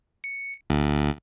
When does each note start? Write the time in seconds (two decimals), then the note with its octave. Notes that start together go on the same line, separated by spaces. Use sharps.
0.24 C#7
0.70 D2